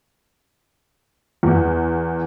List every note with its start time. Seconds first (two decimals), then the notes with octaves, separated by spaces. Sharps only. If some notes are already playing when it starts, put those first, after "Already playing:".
1.43 E2